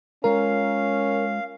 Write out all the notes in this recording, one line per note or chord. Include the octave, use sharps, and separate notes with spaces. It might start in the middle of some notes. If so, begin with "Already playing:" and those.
G#3 C#4 F4 A#4 F5 A#5